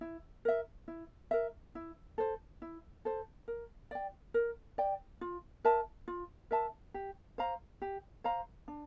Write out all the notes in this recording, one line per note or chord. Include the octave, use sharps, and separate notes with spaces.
E4
A#4 E5
E4
A#4 E5
E4
A4 C5
E4
A4 C5
A#4
D5 G5
A#4
D5 G5
F4
A#4 E5 A5
F4
A#4 E5 A5
G4
C5 F5 A#5
G4
C5 F5 A#5
D4